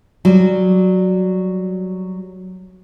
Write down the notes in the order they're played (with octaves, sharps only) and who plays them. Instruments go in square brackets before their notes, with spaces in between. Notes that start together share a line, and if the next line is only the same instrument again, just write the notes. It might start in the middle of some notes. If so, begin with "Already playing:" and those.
[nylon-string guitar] F#3 G3